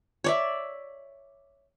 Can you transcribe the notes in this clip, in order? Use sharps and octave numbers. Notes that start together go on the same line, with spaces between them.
C#5 D5 E5